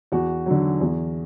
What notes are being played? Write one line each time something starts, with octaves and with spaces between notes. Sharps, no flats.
E2 F#4
D3 F#3
E2